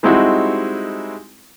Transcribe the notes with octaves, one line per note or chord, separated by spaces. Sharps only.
G3 G#3 C4 D#4 E4 F#4